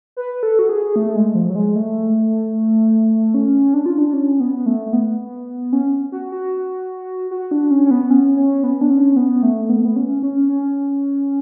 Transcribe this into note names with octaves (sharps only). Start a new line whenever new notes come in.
B4
A4
F#4
G#4
A3
G#3
F3
F#3
G#3
A3
C#4
D4
F4
D4
C#4
B3
A3
A3
B3
C#4
F#4
F#4
F#4
D4
C#4
C#4
B3
C#4
C#4
B3
D4
C#4
B3
A3
B3
A3
B3
C#4
C#4
C#4